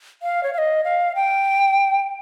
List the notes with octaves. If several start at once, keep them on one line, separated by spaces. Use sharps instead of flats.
F5
C#5
F5
D#5
F5
G5